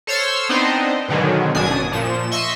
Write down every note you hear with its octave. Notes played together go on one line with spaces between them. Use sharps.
A4 C5 C#5 C6 E6 F6
B3 C4 D4 D#4 C5 D#5
G#2 B2 D3 D#3 F#3 G#3
G1 F#2 B2 D4 G#5 D#6
A#2 F3 E7
D#5 E5 C6 C#6 E6